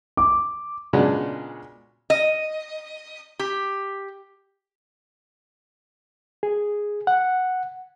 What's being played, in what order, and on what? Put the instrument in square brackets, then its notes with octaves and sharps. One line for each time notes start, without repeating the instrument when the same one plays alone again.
[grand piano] D6
[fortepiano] A#2 C#3 G#3 B3 D4 F#4
[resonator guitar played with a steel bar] D#5
G4
[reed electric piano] G#4
F#5